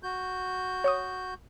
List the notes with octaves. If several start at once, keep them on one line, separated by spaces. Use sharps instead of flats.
F#4 G6
C#5 C#6 D#6